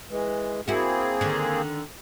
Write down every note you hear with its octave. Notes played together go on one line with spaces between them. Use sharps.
E3 G#3
A#3 C4 E4 F#4 G#4
D3 D#3